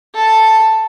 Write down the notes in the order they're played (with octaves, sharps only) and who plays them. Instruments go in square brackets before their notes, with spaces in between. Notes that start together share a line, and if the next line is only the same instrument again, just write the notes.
[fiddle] A4